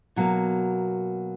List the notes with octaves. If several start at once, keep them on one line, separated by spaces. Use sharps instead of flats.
B2 F#3 A#3